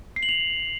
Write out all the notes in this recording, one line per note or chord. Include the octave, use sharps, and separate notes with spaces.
C7
F#7
F7